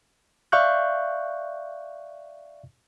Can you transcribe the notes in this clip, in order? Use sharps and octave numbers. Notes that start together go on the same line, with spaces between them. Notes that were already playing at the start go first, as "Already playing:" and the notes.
D5 E5 F5 C#6 F#6 G6